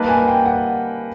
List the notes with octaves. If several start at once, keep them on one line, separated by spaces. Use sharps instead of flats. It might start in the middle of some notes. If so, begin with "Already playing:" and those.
Already playing: G3 A#3 D#4 G4 B4 A5
G#5
G5
F#5